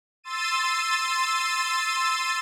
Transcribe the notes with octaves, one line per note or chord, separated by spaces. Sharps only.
C6 E6 A6 D#7